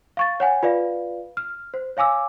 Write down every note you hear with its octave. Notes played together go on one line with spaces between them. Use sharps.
F5 C#6 A6
C#5 F#5 G#5
F4 B4 D5 F5
F6
C5
C#5 F5 G#5 D6 E6